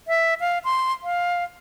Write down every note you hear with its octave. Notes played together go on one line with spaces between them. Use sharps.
E5
F5
C6
F5